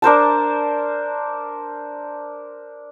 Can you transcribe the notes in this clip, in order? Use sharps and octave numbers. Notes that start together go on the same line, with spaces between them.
D4 A#4 C5 A5